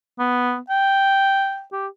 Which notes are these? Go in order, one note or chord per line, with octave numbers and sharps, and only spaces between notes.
B3
G5
G4